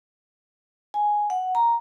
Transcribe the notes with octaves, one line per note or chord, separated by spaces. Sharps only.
G#5
F#5
A#5